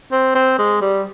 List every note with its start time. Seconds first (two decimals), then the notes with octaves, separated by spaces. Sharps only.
0.12 C4
0.35 C4
0.58 G#3
0.81 G3